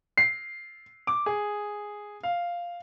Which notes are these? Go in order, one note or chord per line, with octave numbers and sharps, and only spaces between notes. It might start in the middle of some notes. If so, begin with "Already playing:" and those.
C7
D6
G#4
F5